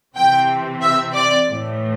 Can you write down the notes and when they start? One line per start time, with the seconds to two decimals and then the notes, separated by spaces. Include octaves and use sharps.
0.15 C3 E3 C4 G5
0.82 E5
1.14 D5
1.47 A2 E3 A3